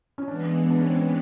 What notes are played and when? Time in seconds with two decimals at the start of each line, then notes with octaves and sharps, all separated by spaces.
0.18 C#4
0.28 E3 G#3 B3 D4
0.70 D4
0.79 C#4
0.88 C4
0.96 C#4